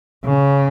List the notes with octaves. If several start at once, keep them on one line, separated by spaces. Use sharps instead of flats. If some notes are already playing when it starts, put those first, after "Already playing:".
C#3